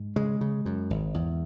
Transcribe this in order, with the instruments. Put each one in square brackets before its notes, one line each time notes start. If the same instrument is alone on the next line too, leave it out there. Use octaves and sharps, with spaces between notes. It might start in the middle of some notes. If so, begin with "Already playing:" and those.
Already playing: [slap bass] G#2
C#3 G#3
C#3
F#2
G#1
E2